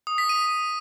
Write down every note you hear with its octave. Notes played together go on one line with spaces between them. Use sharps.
D#6
B6
D#7